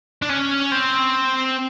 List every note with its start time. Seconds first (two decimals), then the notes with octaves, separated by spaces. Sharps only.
0.22 D4
0.29 C#4
0.71 C4